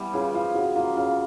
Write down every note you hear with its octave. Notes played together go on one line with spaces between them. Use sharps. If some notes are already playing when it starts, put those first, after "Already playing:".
Already playing: E3 G3 B3
C#3 F4
F3 F4
C#3 F#4
A#3 F4
C#3 F4